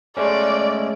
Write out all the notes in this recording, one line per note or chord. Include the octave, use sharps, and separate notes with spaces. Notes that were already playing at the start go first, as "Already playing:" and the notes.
G#3 A3 C#4 D5